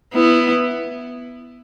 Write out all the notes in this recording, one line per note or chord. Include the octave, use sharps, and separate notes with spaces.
B3 E4